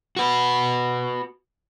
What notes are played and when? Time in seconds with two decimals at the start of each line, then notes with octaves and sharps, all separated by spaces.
0.16 F#4 B4